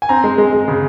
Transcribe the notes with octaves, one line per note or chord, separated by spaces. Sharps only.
G#5
C4 A#5
G#3
G#3
G#3
C#3